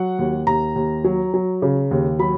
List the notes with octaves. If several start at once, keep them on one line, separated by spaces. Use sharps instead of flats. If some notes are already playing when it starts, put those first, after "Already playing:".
Already playing: F#3 F#5
D#2
D#2 A#5
D#2
F#3
F#3
C#3
D#2
F#3 B5